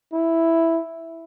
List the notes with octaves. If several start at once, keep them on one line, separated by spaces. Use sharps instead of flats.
E4